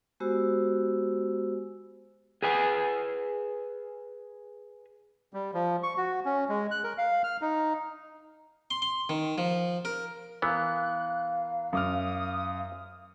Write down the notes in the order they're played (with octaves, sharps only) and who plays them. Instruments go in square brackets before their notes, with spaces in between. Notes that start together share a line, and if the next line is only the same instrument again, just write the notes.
[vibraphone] G#3 B3 F#4 G4 C5 E6
[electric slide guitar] G#4 B4 G#5
[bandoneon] G3
F3
C#6
F#4
C#4
G#3
F#6
A#4
F5
F6
D#4
[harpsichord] C6
C6
D#3
F3
A#4
[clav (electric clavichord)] E3 B3 [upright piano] A#4 [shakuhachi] F5 [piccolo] F#6
[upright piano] F#2 D6 F6 [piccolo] D#6